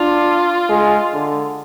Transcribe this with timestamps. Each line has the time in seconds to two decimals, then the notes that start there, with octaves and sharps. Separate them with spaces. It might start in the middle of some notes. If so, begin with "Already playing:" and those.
Already playing: D4 F4
0.69 G#3
1.13 D3